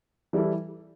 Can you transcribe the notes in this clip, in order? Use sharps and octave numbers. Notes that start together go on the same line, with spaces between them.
E3 G3 E4 A4